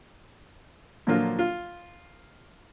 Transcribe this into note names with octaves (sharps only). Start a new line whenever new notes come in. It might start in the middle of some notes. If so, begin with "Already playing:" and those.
A#2 D3 F3 F#3 A#3 F4
F4